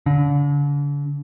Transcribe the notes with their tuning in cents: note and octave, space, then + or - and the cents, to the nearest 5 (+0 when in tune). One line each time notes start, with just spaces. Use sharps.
D3 -40